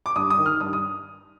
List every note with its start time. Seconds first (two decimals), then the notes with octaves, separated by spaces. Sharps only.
0.06 D6
0.16 G2 D#6
0.30 D#6
0.38 D#3
0.46 F6
0.60 G2 D#6
0.73 D#6